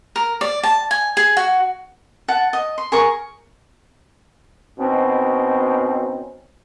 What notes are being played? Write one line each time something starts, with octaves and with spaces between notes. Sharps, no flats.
A#4
D5
A5
G#5
G#4
F#4
F#5 A5
D#5
C6
G#4 A#4 C#6
B2 C4 C#4 D#4